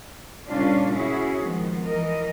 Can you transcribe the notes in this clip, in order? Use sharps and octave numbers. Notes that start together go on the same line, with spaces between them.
A#2 C#3 G3 C#4 D4 F4
C#4 E4 F#4 G#4
D#3 F3 G#3 B3
E3 A#4 D#5